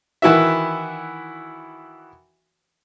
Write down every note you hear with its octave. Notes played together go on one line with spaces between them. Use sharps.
D#3 E3 E4 F#4 E5